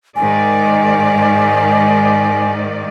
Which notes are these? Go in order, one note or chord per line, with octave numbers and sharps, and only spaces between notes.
G#2 D#3 D5 G#5